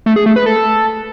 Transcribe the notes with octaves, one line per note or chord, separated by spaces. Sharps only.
A3
G#4
A3
B4
A4